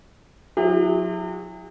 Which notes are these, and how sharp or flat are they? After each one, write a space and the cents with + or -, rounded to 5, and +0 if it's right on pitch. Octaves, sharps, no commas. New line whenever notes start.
F#3 -35 E4 +0 G4 +45